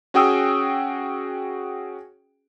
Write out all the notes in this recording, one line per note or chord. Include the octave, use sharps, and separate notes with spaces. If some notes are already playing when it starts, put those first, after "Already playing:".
C#4 F#4 G#4 G5 D#6 E6